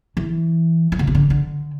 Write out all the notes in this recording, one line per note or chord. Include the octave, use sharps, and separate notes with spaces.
E3
E3
D3
C3
D3
D3